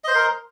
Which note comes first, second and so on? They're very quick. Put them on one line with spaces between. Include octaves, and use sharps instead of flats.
D#5 C5 C6 A#4